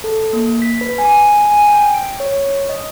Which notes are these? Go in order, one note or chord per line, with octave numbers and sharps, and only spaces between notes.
A4
A#3
B6
B4
G#5
G#5
G5
D7
C#5
D#5